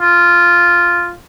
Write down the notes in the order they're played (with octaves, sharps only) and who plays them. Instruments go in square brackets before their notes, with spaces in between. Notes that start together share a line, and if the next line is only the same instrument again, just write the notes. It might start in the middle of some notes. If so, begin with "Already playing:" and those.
[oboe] F4